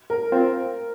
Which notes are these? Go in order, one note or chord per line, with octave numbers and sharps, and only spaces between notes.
A#4
C4 F4 C5